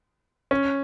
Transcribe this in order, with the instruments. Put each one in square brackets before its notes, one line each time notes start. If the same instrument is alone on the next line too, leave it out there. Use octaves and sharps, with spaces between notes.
[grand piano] C#4